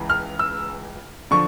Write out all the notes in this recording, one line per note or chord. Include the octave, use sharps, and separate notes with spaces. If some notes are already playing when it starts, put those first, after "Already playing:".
Already playing: C#2 C#3 E3
F6
E6
D3 F3 C#6